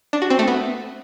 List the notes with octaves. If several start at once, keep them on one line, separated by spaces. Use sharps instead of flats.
D4
F#4
C4
A3
B3